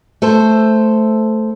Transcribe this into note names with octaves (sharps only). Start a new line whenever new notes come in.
A3 A4 C5